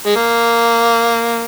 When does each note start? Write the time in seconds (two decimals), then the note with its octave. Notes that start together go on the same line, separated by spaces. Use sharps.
0.06 G#3
0.16 A#3